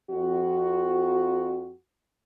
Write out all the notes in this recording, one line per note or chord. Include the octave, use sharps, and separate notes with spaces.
F2 F#4